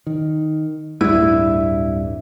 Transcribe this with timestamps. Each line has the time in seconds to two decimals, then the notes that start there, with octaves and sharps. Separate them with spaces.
0.07 D#3
1.01 D1 G2 E4